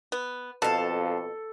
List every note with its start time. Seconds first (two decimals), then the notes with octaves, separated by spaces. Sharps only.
0.12 B3
0.62 F2 B2 A4 F5 A5